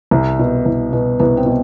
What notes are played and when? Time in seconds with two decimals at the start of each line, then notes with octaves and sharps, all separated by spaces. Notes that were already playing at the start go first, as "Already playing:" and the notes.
0.11 C2
0.39 B2
0.66 C2
0.93 B2
1.19 C2 B3
1.37 C4
1.46 B2